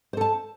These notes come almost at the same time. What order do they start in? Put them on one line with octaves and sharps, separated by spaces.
C5 A4 A5